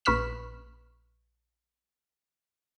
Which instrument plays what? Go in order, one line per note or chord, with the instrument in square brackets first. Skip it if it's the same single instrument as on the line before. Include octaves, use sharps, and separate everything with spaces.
[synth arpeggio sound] A#1 B4 C#6 F6 B6 E7